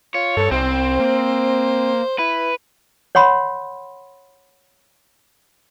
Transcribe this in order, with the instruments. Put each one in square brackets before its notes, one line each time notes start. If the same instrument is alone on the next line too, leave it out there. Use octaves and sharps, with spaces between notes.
[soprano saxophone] F4 [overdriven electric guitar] C#5
[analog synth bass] G2 [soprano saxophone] A4
[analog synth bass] C2 [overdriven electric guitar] C4 [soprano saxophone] C5
[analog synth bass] A#3
[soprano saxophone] E4 [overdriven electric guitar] B4
[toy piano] C#5 F#5 B5 C6